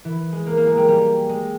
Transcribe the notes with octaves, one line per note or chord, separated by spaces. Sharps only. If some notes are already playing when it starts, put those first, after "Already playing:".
E3
G#3
A#3
A#3
G#3
G3
G3
G#3